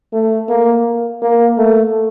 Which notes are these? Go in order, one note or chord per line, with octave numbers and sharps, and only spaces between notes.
A3
A#3
A#3
A3